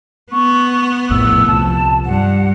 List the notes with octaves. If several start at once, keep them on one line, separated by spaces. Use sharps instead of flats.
B3 C#6
A#1 F2 A2 E6
C2 F3 A5
G2 F#5